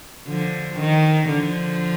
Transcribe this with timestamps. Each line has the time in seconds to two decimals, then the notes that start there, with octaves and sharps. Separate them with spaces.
0.28 D3 F3
0.80 D#3
1.32 D3 F3